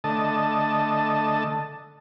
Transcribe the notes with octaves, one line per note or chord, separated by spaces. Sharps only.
D3 A3 D#5 A5